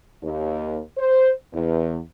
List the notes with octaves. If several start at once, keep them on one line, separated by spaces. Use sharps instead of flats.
D#2
C5
E2